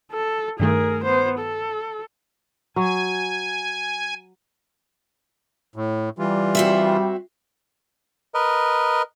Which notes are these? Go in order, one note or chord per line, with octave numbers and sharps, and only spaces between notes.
A4
G2 D#3 A3 G#4 A#4
B3 C5
A4
F#3 G#5
A2
E3 G3 F4
C4 F#4 E5
A#4 B4 D#5